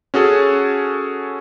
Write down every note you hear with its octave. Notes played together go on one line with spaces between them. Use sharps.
C#4 F#4 G#4 A4